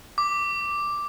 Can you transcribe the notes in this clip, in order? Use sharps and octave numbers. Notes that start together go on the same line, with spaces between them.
D6